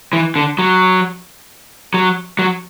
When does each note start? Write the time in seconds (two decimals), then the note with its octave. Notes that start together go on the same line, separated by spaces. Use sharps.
0.13 E3
0.36 D3
0.59 F#3
1.94 F#3
2.39 F#3